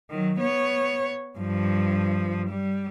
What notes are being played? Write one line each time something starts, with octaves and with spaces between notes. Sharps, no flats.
D#3 F#3
B3 C#5
G2 F3
G3